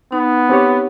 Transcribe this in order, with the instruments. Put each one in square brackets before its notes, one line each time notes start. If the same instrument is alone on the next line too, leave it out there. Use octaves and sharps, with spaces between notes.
[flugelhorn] B3 [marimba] D#4
[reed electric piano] C4 G4 C#5